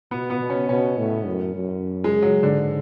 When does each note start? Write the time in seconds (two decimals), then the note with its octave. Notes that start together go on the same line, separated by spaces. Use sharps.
0.11 B2 B3
0.30 B3
0.40 B2
0.50 C#4
0.69 B2 C#4
0.98 A2
1.27 F#2
1.55 F#2
2.04 G#3
2.22 F#3
2.42 G#2 D3